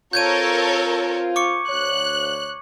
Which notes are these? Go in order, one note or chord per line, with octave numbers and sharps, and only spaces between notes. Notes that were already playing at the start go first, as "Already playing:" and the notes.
C4 F4 A4 A#4 C#5 G6 G#6 D#7
C#6 D6 C#7
D2 C#5 F#6